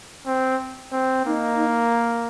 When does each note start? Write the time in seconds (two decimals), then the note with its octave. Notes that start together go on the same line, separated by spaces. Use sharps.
0.26 C4
0.93 C4
1.26 A#3 D#4